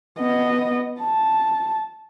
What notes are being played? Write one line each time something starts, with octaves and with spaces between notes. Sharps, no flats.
B3 D#5
A5